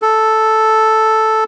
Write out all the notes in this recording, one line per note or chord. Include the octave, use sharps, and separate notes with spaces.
A4